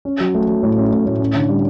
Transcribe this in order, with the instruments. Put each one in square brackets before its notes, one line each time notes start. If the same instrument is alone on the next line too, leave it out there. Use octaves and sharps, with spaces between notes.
[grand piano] C#4
F#3
A3
F#3
A2
C#4
A2
A2
C#4
D3
G3